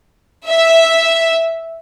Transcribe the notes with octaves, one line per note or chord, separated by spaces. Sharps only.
E5